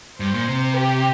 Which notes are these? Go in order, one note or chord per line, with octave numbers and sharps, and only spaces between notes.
G2 C5
A#2
C3
G4